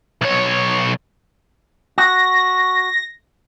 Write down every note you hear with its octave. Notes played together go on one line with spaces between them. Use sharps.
B1 C#5
F#4 A#6